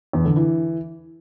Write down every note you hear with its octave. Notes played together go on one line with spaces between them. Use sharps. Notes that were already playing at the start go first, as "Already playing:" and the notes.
E2
D3
E3